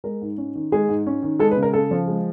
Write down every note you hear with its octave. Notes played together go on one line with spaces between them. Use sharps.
G#3 A#4
G#2
C#4
D#3
G#3 G#4
G#2
C#4
D#3
G#3 A4
B4
C#3
A#4
C#3 A4
F3
G#3